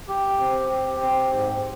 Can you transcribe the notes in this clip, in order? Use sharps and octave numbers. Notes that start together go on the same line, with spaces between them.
G4
C4
G4
C4
G#2